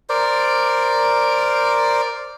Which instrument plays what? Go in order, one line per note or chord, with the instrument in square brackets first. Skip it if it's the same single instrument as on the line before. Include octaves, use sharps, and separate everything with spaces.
[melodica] A#4 C5 D5